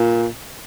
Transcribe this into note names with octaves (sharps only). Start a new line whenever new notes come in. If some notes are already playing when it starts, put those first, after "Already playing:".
Already playing: A#2